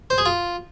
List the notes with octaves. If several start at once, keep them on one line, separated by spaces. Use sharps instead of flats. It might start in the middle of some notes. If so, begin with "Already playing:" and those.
C5
G#4
F4